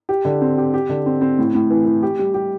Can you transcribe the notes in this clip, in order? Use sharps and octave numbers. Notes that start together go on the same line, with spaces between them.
G4
D3
C4
G4
G4
D3
C4
C4
A2
A2
E3
E3
G4
G3
G4